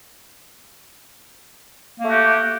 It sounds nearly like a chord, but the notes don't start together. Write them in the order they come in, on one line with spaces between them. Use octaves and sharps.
A#3 A3 F#4 G4